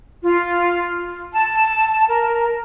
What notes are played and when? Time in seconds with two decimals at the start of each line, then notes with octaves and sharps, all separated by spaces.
0.22 F4
1.33 A5
2.08 A#4